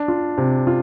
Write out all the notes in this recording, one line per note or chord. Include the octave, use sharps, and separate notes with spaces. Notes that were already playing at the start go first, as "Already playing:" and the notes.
Already playing: D4
F4
C3
F4